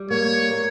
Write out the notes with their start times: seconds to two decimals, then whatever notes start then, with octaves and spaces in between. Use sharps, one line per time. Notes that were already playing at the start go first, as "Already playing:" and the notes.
Already playing: G3
0.10 A#3 C#5
0.51 A#3